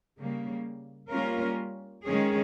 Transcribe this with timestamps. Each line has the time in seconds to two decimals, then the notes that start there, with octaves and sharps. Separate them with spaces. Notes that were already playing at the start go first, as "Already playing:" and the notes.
0.18 C#3 G3 A#3
1.11 G3 A#3 C#4 F4 A#4
2.06 D#3 G#3 C#4 G#4